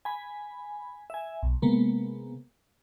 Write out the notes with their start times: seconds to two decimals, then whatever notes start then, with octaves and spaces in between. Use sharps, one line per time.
0.05 G#5 B5
1.10 E5 G#5
1.43 B1
1.62 C3 G#3 A#3 B3